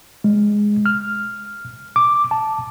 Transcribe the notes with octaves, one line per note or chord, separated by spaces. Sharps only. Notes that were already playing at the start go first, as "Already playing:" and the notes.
G#3
F6
D6
A5